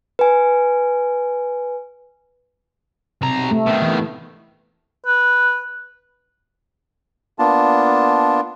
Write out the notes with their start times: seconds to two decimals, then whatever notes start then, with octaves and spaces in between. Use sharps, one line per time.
0.19 B4 G#5
3.22 B1 C3 A#5
3.51 A3
3.66 B2 D#3
3.82 E3
5.06 B4
7.39 A#3 B3 D4 F4 A5